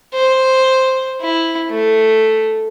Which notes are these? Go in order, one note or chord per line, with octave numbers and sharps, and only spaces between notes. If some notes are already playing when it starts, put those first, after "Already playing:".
C5
E4
A3